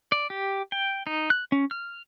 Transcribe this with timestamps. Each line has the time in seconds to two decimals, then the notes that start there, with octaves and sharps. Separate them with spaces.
0.12 D5
0.30 G4
0.72 G5
1.07 D#4
1.30 F#6
1.52 C#4
1.71 F6